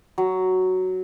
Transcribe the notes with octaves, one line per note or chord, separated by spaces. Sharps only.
F#3